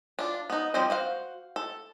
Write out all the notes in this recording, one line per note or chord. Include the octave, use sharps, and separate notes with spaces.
D4 F4
B3 D#4
F3 G3 C4 C5 D#5
F#4 C5 F5
A4